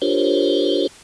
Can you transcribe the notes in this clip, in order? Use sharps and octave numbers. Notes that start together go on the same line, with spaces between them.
D4 F4 G4 A#4 C5 C#5